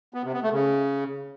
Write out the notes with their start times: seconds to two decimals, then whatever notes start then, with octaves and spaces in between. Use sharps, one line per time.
0.14 B3
0.24 C3
0.33 B3
0.43 A3
0.53 C#3